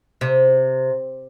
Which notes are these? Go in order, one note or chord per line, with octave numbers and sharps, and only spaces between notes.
C3